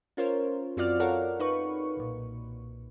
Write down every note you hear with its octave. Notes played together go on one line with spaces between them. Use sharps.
C#4 F4 A#4 C5 C#5
F#2 C4 F4 F#4 D5 F6
F#4 A4 A#4 C#5 F5 F#5
D#4 B4 C#6
B1 A#2